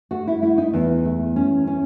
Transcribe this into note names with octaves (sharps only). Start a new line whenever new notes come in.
A3 F#4
E4
A3 E4
D#4
E2
A3
C#4
C#4